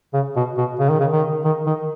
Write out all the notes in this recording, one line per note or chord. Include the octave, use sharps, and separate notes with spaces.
C#3
B2
B2
C#3
D#3
C#3
D#3
D#3
D#3